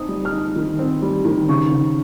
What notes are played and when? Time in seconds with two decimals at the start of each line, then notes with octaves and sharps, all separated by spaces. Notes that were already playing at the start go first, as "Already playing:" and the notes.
Already playing: C4 D#4 D#6
0.08 G3
0.25 F6
0.32 D#4
0.56 D#3
0.79 C4
1.02 G3
1.25 D#3
1.48 C#3 C#6
1.72 C#3